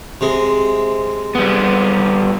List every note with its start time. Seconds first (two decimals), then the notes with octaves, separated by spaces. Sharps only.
0.21 C3 G#3
1.35 G3 B3